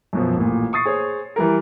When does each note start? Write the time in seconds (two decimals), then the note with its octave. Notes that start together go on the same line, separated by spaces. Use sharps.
0.13 F#2 B2 F3
0.36 A1 A#2
0.73 C#6 D#6 A6 C7
0.85 G#4 C5 C#5
1.36 E3 G3 A#4